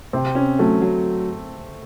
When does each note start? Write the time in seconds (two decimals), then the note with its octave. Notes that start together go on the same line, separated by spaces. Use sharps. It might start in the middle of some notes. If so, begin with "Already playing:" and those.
0.13 C3 C4
0.35 C#4
0.59 F#3 A3
0.81 F#3